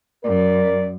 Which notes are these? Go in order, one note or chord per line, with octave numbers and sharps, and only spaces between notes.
F#2 A#4 D5